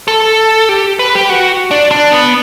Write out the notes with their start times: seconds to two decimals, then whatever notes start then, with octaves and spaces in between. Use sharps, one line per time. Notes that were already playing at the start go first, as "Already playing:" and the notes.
0.08 A4
0.69 G4
0.99 B4
1.15 G4
1.30 F#4
1.71 D4
1.91 D4
2.11 B3